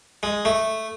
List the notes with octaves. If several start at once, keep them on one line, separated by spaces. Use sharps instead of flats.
G#3
A3